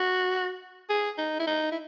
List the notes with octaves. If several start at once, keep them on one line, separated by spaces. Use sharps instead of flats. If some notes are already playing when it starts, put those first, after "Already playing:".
Already playing: F#4
G#4
D#4
E4
D#4
E4